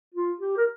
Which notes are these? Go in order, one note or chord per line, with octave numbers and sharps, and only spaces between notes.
F4
G4
A#4